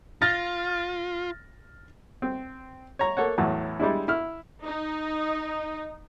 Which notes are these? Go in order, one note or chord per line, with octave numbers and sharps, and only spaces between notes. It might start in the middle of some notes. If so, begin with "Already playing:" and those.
F4 F6 A6 A#6
C4
C#5 A#5
A#3 A4 C#5 F#5
E2 A2 F#3
G3 G#3 D4 E4
E4 F6
D#4